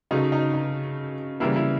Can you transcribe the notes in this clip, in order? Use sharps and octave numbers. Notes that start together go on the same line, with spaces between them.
C#3 F#3 A3 D#4
D#4
D#4
C#3 E3 G3 A#3 E4
E4